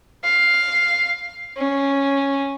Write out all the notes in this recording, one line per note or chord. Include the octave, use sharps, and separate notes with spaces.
F5
C#4